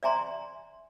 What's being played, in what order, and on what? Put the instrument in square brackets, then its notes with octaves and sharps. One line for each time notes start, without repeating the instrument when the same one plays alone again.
[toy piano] D5 E5 G#5 A#5 C6